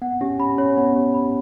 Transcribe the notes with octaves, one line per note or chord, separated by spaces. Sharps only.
B3 F#5
C#4 G4
C#4 B5
C#4 C#5
B3 F#5
G4
B5